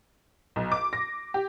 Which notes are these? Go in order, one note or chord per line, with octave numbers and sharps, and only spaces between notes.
B1
D6
A#6
G4